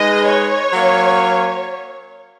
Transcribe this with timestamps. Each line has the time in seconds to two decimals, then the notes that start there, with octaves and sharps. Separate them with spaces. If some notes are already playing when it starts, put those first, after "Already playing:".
Already playing: G#3 D#4 G#4 B4 D#5
0.26 C#5
0.73 F#3 A#3 C#4